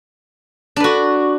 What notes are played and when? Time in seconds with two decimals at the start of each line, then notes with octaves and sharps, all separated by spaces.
0.76 D4
0.80 B4
0.84 F#4